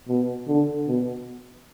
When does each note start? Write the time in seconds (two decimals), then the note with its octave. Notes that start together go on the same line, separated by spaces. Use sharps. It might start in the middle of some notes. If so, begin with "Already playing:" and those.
0.09 B2
0.48 D3
0.88 B2